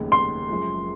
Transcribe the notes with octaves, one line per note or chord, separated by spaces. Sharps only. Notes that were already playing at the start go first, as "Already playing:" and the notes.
Already playing: F1 D#2 C#3 G#3
C6
F#1 F#2 F3 G#3